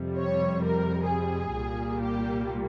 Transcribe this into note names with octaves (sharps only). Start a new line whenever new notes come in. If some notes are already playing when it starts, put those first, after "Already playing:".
Already playing: F2 C3 G3
C#5
A#4
G#4
C2 A#2 G3 A#3
G4